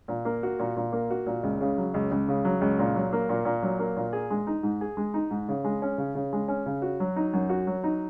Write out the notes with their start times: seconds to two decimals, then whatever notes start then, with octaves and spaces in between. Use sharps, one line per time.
0.08 A#2
0.25 A#3
0.43 F#4
0.59 A#2
0.76 A#2
0.92 A#3
1.10 F#4
1.26 A#2
1.43 C#2
1.61 C#3
1.78 F#3
1.94 C#2
2.11 C#2
2.28 C#3
2.45 F#3
2.61 C#2
2.79 A#2
2.96 F#3
3.13 A#3
3.29 A#2
3.45 A#2
3.63 F#3
3.79 A#3
3.96 A#2
4.13 G#4
4.31 G#3
4.47 D#4
4.63 G#2
4.81 G#4
4.97 G#3
5.14 D#4
5.31 G#2
5.48 C#3
5.64 G#3
5.82 C#4
5.98 C#3
6.15 C#3
6.33 G#3
6.48 C#4
6.66 C#3
6.82 F#4
7.00 F#3
7.16 D#4
7.33 F#2
7.49 F#4
7.67 F#3
7.84 D#4